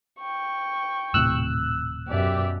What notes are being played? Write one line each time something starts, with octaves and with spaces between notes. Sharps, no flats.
G5 C#6
D#1 A2 C3 E6 F#6
F#2 B2 G4 D5 E5